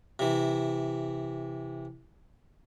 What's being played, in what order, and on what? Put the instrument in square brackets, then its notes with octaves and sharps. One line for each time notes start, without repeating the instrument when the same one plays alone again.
[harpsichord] C3 E3